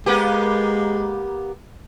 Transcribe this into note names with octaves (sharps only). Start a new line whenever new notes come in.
G#3 A#3 B3 G4